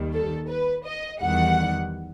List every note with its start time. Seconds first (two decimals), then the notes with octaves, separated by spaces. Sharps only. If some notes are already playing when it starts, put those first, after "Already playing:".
Already playing: D#2 D#3 G3
0.14 A4
0.49 B4
0.85 D#5
1.20 E2 D#3 G3 F#5